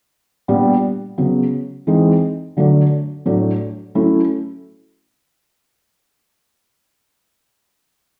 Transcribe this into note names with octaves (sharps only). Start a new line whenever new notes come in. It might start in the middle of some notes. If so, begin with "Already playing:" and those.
A#2 G3 B3 D4
C#3 F#3 B3
E3 G#3 C4 D#4
D3 F#3 A3 D4
A2 F#3 A3 D4
F#3 A3 C#4 E4